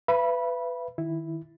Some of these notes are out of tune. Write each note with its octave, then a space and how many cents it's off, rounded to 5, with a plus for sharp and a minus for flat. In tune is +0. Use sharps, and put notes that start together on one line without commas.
B4 +20 E5 +40 B5 -20
D#3 +0 E4 +0